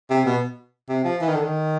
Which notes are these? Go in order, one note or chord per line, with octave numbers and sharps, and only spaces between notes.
C3
B2
C3
F3
E3
D#3
D3
D#3